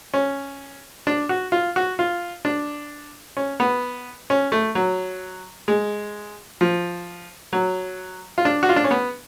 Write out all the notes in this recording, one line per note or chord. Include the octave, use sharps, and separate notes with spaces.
C#4
D4
F#4
F4
F#4
F4
D4
C#4
B3
C#4
A3
F#3
G#3
F3
F#3
F4
D4
F#4
F4
D4
C#4
B3